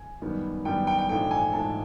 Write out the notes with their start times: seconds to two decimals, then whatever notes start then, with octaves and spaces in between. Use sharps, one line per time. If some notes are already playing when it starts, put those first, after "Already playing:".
Already playing: G#5
0.22 F#2 D#3 G3 B3
0.65 F#2 D#3 G3 B3 G5
0.87 G5
0.98 G5
1.09 A#1 G#2 E3 A3 G5
1.31 G#5
1.53 A#1 G#2 E3 A3 A5